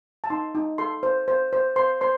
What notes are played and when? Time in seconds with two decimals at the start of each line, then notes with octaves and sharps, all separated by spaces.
0.24 A5
0.30 D#4 C6
0.55 D#4
0.78 A4 C6
1.03 C5
1.28 C5
1.53 C5
1.76 C5 C6
2.01 C5 C6